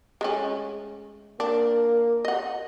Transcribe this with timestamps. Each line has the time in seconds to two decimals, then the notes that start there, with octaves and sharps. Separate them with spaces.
0.21 G#3 A3 C#4
1.40 A#3 D4
2.25 D#5 F#5